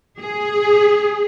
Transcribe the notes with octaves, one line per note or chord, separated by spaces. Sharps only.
G#4